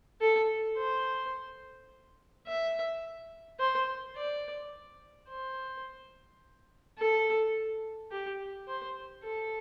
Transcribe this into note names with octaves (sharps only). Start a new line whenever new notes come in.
A4
C5
E5
C5
D5
C5
A4
G4
C5
A4